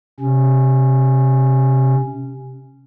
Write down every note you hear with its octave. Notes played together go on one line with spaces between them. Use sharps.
C3 C#4